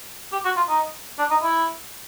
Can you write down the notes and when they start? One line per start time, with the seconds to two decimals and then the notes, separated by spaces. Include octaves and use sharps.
0.33 G4
0.45 F#4
0.57 F4
0.69 D#4
1.18 D4
1.30 D#4
1.43 E4